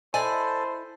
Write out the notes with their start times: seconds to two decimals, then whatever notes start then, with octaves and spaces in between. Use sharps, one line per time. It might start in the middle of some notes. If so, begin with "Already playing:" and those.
0.14 E4 A4 C5 D5 D#5 G#5